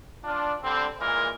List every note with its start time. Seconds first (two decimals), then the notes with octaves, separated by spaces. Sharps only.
0.24 D4 F4
0.63 D3 G3 C4
1.00 A#2 E3 G#3 A#4